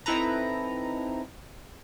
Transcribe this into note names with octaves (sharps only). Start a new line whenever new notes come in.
C4 D#4 E4 A4 B4 A#5